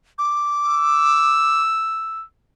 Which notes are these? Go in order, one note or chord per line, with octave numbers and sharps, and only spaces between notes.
D6
E6